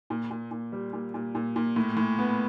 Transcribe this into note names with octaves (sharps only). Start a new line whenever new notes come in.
A#2
A#2
A#2
G3
A#2
A#2
A#2
A#2
A2
A2
B3